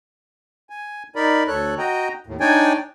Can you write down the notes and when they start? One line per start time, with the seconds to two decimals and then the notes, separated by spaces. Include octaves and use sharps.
0.70 G#5
1.16 D#4 A#4 D5 B5
1.48 D2 A4 C#5 F#6
1.78 F#4 D#5 G5 A#5
2.27 D#2 A2
2.40 D4 D#4 C#5 D5 G5 G#5